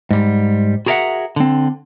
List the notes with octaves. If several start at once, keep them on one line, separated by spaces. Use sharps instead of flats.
G#2 G3
F#4 G#4 A#4 C#5 E5 F#5
D3 C4